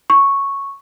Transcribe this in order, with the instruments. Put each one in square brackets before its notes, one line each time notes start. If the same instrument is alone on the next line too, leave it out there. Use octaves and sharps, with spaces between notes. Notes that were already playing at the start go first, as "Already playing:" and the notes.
[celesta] C#6